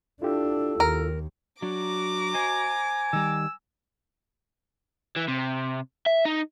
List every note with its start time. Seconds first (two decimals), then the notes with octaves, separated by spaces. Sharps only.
0.22 D4 E4 F4 G4 A4
0.80 D#2 A#4
1.62 F#3 D4 F#4 A#5 D6
2.34 C5 D#5 G#5
3.13 D#3 G3 E6
5.16 E3
5.28 C3
6.06 E5
6.25 D#4